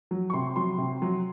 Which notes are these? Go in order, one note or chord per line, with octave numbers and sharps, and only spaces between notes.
F#3
C#6
C3 C6
F#3 C6
C3
F#3